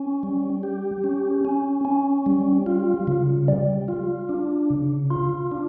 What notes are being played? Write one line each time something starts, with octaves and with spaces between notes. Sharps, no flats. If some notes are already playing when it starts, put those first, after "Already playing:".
Already playing: C#4
G3
G4
C#4
C#4
C#4
G3
F4
C#3
G3
F4
D4
C#3
F4
D4